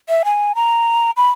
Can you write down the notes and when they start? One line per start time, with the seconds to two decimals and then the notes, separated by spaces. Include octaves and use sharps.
0.09 E5
0.25 G#5
0.55 A#5
1.17 B5